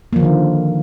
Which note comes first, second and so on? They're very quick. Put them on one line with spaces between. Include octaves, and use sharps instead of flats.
A#3 F3 D3 D#3